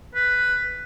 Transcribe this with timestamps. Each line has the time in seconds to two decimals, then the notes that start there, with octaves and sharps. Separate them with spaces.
0.15 B4